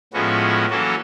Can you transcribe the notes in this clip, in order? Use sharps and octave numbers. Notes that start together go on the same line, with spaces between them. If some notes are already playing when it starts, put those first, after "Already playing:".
A2 F3 G#3 B3 C#4 F#4
E3 F#3 A#3 C#4 F#4 A4